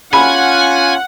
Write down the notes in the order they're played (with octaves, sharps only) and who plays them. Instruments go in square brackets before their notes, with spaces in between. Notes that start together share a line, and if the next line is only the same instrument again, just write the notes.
[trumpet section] C#4 F4 [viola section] F#5 [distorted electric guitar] G#5 [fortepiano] B5